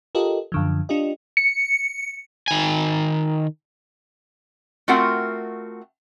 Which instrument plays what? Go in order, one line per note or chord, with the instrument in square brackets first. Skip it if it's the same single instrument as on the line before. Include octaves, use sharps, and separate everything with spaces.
[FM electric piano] F4 G4 A4 A#4 D#5
F#2 D3 F3
D4 F4 G4 D#5
C#7
[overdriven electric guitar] D#3 G#5
[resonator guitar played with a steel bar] A3 C4 F4 F#4 A#4 F#5